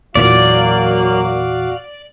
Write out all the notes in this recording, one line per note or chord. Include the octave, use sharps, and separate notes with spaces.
E2 A#2 E3 F#3 A#3 F#4 D5 F5